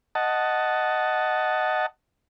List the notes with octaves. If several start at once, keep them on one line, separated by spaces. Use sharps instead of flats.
D#5 F#5 A5